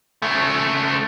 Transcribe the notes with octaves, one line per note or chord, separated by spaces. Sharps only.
C#3 A3